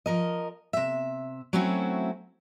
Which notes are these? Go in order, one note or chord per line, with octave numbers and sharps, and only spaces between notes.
F3 A#4 D#5
C3 E5
F#3 A3 C4 C#4 E4 F#4